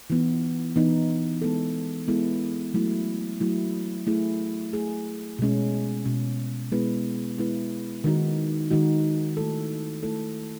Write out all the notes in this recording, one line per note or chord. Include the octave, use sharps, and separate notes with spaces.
E3 B3 D#4
E3 B3 D#4
G#3 B3 E4 A4
G#3 B3 E4 A4
F#3 A3 E4
F#3 A3 E4
A3 E4 G#4
A3 E4 G#4
B2 G#3 C#4
B2 G#3 C#4
G#3 B3 E4 B4
G#3 B3 E4 B4
D#3 G#3 D#4 F#4
D#3 G#3 D#4 F#4
A3 E4 A4
A3 E4 A4